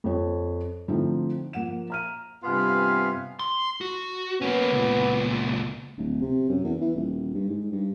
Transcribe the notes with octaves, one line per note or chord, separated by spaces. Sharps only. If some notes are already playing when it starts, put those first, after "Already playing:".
F2 F3 C#5
D3 F3 A3 C4 D#4 E4
F3 A#3 F#5 E7
A#5 F6 D#7
G2 C3 B3 F4 F5 G#5
C6
F#4
A#3 B3 C#4
C#2 A#2
D1
C3
F#2
E2
E3
D#1
G2
G#2
G2